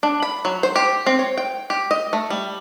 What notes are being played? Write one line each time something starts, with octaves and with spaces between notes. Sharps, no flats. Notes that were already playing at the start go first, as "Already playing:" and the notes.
D4
B5
F#3
C5
G4
C4
C#5
G5
G4
D#5
A3
G3